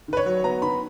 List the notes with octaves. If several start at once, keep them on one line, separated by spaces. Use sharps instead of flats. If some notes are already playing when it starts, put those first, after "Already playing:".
D#3 B4
C#5
F#3
B3 A#5
D#3 B5